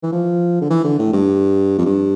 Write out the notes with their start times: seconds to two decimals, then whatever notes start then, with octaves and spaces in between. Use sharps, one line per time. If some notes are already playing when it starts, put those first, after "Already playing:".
0.03 E3
0.12 F3
0.62 D3
0.70 E3
0.84 D3
0.99 A2
1.13 G2
1.78 F2
1.85 G2